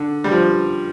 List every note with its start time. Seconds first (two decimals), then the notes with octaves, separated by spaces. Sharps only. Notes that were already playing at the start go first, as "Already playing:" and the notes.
Already playing: D3
0.24 G3
0.31 F3